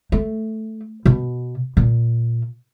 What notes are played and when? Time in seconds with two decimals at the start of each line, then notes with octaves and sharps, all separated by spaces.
0.12 A3
1.06 B2
1.77 A#2